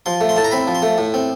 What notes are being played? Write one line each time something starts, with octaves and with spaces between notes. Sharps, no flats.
F3 C6
A3
C6
A2 A5
A#5
C4 B5
F3
C6
A3
A2
C4